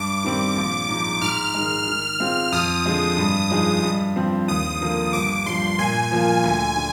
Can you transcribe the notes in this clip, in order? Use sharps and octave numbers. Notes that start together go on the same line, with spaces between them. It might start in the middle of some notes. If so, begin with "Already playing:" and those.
Already playing: G2 D6
D#3 G3 C4
A#1
G#2 F3
G#2 F6
D#3 G#3
D#3
G#3 C4 F4
F2 D#6
D3 F3 G#3
G2
F3 G#3 D#4 G#4
G2
F3 C4
D#2 D#6
D3 F3 A#3
G1 D6
G2 F3 C6
A#2 G#5
F3 A#3 F4
D2
D3